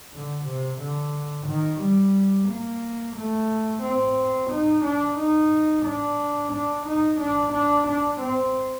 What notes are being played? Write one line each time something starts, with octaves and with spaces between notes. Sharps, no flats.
D3
C3
D3
D#3
G3
A#3
A3
C4
D#4
D4
D#4
D4
D4
D#4
D4
D4
D4
C4